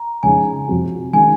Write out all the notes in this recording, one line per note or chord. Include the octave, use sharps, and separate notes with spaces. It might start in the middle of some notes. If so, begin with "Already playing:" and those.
Already playing: A#5
C#3 F3 G#3 D#4 G#5
C3 F3 C4 F#4
D#3 G#3 C#4 G#5